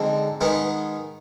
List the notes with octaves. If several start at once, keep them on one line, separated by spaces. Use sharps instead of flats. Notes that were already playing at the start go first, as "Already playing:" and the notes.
Already playing: D3 F3 G#3 C4 D#4
D#3 G#3 B3 D#4